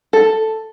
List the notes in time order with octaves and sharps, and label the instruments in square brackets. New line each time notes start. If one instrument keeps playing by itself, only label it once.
[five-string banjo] A4